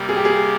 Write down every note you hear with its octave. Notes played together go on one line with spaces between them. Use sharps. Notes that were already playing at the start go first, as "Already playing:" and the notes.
Already playing: C3 G3 A#3
G#4
G4
G#4